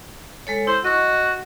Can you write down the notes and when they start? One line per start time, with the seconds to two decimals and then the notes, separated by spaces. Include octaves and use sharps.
0.47 G#3 A4 C#5
0.67 E4 C5
0.85 F#4 D#5 C#6